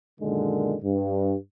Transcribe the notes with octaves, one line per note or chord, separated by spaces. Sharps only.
F#2 A#2 D3 D#3 G#3
G2